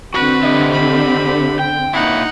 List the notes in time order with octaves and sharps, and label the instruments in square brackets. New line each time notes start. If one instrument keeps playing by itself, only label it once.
[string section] D3 C4 [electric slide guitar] F#4 [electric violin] B4
[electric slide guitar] G4 D#5 E5
[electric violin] B5
[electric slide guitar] G5
[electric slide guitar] A#2 E4 [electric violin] D#4 F#5